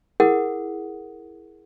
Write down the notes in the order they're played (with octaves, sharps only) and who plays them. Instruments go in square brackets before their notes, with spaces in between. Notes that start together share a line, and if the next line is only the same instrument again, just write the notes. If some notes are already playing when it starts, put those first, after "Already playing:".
[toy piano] E4 G#4 A#4 F#5 D#6